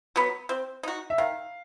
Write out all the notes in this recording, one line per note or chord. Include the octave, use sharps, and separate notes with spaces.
F#3 B3
C4
D#4 F#4
E5
D#3 F5